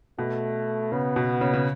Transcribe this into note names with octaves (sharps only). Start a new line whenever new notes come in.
B2 A3
C#3 B3
B2
C#3
C#3